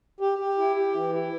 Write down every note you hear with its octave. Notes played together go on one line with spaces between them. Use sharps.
G4
G4
E4
G4
E3
E4